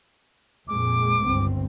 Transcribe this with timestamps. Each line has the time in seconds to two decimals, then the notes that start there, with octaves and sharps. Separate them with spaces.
0.68 F2 A#2 G#3 D6
1.23 G1 C#2 C4